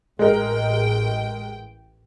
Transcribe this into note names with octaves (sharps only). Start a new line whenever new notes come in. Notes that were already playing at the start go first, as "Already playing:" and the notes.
A1 G#3 A#4 G5